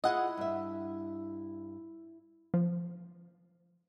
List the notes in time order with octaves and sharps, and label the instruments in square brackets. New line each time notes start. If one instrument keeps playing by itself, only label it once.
[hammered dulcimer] E4 [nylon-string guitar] F4 G#4 [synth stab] D#5 F#5
[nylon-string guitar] G2 E5
[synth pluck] F3